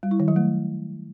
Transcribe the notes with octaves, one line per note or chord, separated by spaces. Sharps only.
G3
E4
D#3
F#3
A3